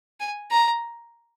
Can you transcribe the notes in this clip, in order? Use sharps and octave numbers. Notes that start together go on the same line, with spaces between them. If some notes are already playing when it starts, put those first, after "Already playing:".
G#5
A#5